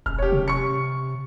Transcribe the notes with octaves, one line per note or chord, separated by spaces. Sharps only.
E1 F6
G4 C#5
C3
C#6 C#7